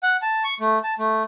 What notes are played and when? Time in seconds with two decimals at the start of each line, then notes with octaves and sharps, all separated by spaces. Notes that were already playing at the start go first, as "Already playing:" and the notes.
0.03 F#5
0.22 A5
0.44 C#6
0.60 A3
0.84 A5
0.99 A3